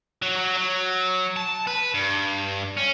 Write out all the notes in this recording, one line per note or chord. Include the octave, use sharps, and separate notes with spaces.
F#3
F#3
F#3
A5
B4
G2
C#4